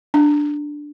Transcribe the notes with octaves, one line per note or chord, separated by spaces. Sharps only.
D4